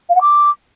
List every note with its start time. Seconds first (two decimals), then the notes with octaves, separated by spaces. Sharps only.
0.09 F5
0.15 F#5
0.21 D6